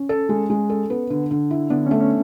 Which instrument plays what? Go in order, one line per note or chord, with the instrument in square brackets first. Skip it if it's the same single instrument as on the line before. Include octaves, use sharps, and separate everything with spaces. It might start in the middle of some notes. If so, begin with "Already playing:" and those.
Already playing: [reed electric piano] C#4
[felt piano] A4
G#3
G#3
A4
B3
D3
D3
E4
[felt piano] D3 [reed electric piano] B3 D4
[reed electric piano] C#4
[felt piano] A3
[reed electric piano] C#4